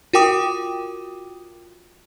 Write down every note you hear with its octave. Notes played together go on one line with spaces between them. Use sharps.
F4 F#4 A#4 G5 D6 D#6